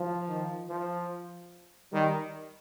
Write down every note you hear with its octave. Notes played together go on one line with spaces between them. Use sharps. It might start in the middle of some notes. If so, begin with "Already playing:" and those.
Already playing: F3
D#3
F3
D#3 G3